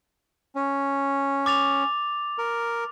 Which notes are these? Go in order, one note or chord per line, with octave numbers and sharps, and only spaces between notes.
C#4
D6 A6 F7
A#4